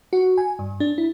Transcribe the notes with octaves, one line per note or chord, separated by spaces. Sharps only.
F#4
G#5
G2
D4
E4